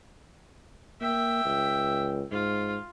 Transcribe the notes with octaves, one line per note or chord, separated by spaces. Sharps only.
A#3 E5 G5
C#2
G#2 F4